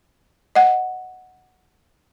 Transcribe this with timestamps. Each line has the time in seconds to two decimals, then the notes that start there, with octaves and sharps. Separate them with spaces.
0.55 D#5 F#5